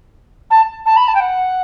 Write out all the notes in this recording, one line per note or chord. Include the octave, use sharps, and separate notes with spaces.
A5
A5
B5
A5
G5
F#5